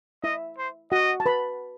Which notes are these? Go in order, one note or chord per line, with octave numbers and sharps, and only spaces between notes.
E4 D#5 E5
C5
F#4 D#5 F#5
A5
B4 B5